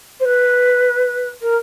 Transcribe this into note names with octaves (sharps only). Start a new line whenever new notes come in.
C5
B4
A#4